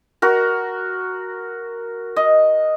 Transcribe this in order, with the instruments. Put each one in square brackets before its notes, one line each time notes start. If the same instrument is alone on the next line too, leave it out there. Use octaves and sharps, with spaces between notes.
[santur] F#4 A#4
D#5